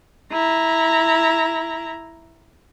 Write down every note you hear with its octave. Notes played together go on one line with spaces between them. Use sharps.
E4 A#5